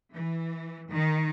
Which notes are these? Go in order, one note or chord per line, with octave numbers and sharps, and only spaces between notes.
E3
D#3